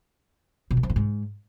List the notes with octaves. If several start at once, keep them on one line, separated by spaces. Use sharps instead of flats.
B2
D#3
F3
A2
G#2